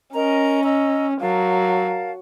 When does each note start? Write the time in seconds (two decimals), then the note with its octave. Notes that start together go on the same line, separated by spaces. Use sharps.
0.14 C#4 A#4 D#5 A#5
0.64 D#5 A#5 E6
1.21 F#3 A#4 F5 A5